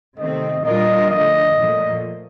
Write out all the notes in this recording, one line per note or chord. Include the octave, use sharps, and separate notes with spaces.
C3 D#3 A3 C4 D#5
A#2 G3 D4 F4 A#4 D#5
D3 F3 A3 D#5
A#2 F3 A3